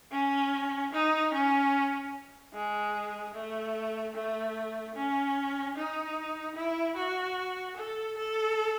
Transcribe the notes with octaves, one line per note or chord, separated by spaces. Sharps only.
C#4
D#4
C#4
G#3
A3
A3
C#4
D#4
E4
F#4
A4
A4